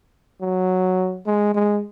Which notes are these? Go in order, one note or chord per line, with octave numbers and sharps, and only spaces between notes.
F#3
G#3
G#3